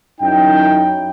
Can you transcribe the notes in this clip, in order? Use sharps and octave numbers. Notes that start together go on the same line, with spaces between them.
F#2 C#4 D#4 E4 G5